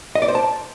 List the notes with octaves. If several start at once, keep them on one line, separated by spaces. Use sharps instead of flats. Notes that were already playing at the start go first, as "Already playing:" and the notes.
D#5
D5
C5
A5